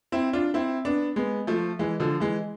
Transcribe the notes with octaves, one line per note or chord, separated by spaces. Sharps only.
C4 E4
D4 F4
C4 E4
B3 D4
G#3 B3
F3 A3
E3 G#3
D3 F3
E3 G#3